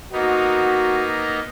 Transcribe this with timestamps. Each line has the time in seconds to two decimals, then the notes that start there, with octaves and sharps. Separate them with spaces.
0.13 A#3 B3 D#4 F#4